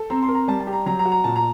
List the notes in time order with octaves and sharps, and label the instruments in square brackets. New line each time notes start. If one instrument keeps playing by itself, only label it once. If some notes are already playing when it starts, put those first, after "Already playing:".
Already playing: [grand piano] A4
[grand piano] C4 [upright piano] A#5
[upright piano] C6
[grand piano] A#4
[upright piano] A#5
[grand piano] G3 [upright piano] A5
[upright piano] A5
[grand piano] G4
[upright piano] A#5
[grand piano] F#3 [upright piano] A#5
[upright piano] A#5
[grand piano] F#4
[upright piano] A#5
[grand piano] A#2 [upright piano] A5
[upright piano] A#5